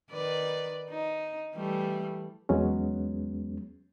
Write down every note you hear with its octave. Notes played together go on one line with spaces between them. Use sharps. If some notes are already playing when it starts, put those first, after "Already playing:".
D#3 B4 D5
D#4
E3 G3 A3
E2 F#3 G#3 B3 C#4